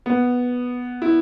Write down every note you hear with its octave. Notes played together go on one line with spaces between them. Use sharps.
B3
E4